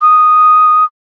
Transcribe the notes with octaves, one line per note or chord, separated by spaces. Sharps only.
D#6